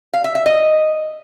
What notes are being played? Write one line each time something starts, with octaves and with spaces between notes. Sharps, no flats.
F5
E5
E5
D#5